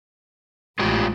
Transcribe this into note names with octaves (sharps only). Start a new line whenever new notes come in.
A1 G#3 F4 G4